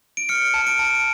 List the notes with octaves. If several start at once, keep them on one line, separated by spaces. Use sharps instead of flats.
D7
F6 C#7
A5
D7
A5